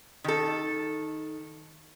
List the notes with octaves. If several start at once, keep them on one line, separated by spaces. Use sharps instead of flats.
D#3 A4